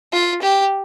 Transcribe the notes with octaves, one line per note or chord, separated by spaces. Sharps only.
F4
G4